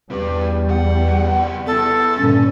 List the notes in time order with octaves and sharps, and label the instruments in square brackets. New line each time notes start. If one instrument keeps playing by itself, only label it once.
[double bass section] E2 G3 [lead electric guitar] G4 B4
[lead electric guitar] C2 F#5
[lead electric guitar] B3 E4 [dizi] A4
[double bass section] G2 A#2 D3 [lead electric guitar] C#4